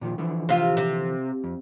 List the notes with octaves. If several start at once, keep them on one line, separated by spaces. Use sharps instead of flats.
A#2 D#3 F3
D3 E3 F3
C3 F4
C3
F2